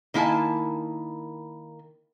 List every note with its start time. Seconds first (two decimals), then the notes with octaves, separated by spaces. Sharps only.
0.14 D#3 A#3 E4 G#5 A5